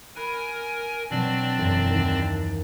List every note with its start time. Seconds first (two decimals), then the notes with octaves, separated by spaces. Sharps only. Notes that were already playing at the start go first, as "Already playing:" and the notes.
0.16 A#4 G#5 B5 F#6 C7
1.10 B2 F#3 C4 D4 D5
1.58 E1 F#2 C7
1.90 D#2